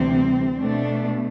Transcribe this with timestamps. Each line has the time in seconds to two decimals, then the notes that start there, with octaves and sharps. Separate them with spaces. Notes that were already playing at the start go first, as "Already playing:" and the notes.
Already playing: D2 C3 E3 G3 C4
0.59 B2 A3 D4